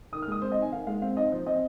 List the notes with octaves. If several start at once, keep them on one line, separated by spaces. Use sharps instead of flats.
D#3 D#6
F6
G#3 D#6
C4 C5
D#5
D#4 G#5
D#3 F5
G#3 F5
C4 F5
D#4 D#5
F3 C5
C4 D#5